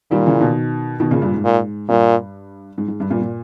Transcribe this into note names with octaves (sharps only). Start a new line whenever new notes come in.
A#2 D#3 G3
C#3 E3
B2 D#3
B2 D#3
A#2 C#3
G2 A#2
G#2
A#2
G2 A#2
G#2
G#2
G2
G2 A#2
A#2